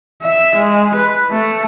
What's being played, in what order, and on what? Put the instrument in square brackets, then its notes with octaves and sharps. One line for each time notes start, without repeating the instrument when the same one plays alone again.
[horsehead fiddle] E5
G#3
B4
A3